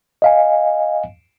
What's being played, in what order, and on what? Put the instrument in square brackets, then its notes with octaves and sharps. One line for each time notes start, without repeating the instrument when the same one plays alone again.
[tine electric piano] D#5 F5 G#5